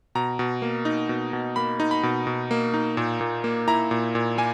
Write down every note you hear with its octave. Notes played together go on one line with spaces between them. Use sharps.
B2 A#5
B2
A#3
D#4
B2
B2
A#3 B5
D#4
B5
B2
B2
A#3
D#4
A#2
A#2
A#3
E4 A#5
A#2
A#2
A#3 G#5